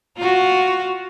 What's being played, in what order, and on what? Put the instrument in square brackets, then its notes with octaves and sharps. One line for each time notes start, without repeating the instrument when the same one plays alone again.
[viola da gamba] F4 F#4